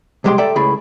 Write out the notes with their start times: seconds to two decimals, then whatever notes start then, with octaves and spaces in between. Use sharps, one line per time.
0.24 C2 F#2 G#3 G4 G5 C6
0.38 A4 D5 E5 G5 A#5
0.56 C#2 A2 A3 G#4 B5